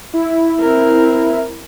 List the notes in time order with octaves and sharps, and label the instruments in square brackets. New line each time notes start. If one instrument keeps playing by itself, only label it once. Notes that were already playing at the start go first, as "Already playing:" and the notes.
[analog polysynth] E4
[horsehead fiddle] C4 A#4